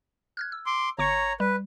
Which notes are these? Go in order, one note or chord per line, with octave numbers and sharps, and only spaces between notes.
F6 F#6 G#6
E6
C6 D6
G1 C#5 A#5 C#6 C#7
G3 B4